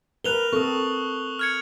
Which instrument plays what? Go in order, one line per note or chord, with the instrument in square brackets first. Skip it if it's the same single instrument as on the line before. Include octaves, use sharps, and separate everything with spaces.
[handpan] A#4 B4 [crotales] F#6 F7 G7
[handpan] C4 A4 [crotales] C#6 D#6
[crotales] F6 G#6 C#7